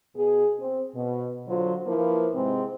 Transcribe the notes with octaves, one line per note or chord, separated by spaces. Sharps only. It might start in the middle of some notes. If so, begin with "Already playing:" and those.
B2 G#4
C4
B2
D3 F#3 F4 C5
F3 A#3 E4 B4
G#2 C3 G#3 C4